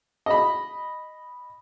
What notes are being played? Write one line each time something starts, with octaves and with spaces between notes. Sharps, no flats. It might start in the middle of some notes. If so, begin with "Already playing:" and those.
D#5 B5